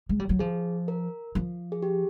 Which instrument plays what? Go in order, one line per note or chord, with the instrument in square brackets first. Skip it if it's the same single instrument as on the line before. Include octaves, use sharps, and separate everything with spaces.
[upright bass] G#3
G3
F#3
[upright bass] F3 [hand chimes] G#4
[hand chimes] A#4
[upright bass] F3
[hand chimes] G#4
G4